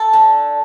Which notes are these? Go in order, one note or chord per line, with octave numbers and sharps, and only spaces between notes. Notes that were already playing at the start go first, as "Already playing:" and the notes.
Already playing: A4
D3